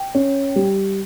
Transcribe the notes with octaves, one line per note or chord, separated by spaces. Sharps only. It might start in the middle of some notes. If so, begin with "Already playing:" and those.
Already playing: G5
C#4
G3